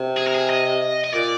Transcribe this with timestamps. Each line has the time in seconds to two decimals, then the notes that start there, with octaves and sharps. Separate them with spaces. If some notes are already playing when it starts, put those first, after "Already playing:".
Already playing: C3
0.17 G#4
0.27 A#4
0.35 G#4
0.50 D#5
1.04 D#5
1.14 A#2 D5